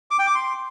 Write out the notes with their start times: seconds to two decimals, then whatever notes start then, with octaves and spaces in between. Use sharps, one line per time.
0.11 D6
0.19 G5
0.27 D6
0.35 C6